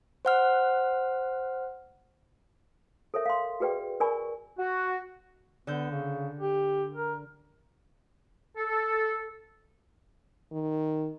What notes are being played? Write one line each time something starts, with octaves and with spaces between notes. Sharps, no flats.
C5 F#5 F6
A4 A#4 C#5 E5
F5 C6
F#4 G#4 B4 D5 G5
A#4 D5 G#5 B5 C#6
F#4
D3 B3 G6
C#3
G4
A#4
A4
D#3